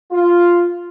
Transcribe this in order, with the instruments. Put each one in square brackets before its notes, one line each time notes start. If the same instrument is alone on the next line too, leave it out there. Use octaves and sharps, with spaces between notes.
[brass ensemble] F4